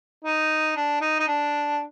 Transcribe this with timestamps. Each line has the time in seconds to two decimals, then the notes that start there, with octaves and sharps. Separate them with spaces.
0.24 D#4
0.76 D4
1.01 D#4
1.20 D#4
1.28 D4